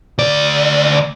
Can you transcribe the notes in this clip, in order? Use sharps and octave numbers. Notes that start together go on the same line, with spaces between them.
D2 D5